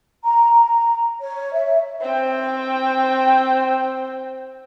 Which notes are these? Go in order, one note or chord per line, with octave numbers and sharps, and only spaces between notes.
A#5
A#5
C#5
E5
C4 G5